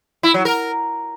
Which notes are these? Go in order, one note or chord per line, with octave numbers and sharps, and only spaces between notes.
E4
F#3
A#4